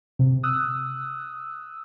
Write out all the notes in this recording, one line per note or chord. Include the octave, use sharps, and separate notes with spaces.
C3
D#6 E6 F#6